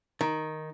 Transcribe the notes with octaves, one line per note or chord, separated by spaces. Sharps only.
D#3